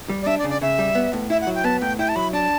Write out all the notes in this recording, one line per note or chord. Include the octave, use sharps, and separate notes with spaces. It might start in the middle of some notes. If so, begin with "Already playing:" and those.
G3
D5
D4 E5
D5
C#3
D5
C#3 E5
G3
B3
A2
E4 E5
F#5
F#3
G5
B3 A5
A2 G5
E4 G5
A5
F#3 B5
D4 A5